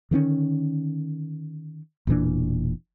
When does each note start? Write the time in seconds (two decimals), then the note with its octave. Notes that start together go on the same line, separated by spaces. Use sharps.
0.11 D3 D#3 A3 C#4
2.07 E1 A#2 E3 D4